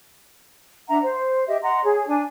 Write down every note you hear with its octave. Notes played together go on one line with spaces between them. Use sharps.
D4 E5 F#5 A#5
C5
G4 D#5 E5
D#5 F#5 A#5 C6
G#4 C#5
D4 G#5